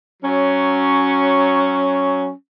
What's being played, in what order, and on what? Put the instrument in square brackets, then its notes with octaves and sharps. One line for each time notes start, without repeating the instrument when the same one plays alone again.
[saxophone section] F#3 C#4